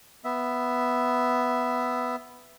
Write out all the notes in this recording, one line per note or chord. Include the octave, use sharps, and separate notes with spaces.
B3 E5